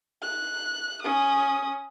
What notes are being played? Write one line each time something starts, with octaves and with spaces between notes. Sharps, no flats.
F#6
C#4 D#6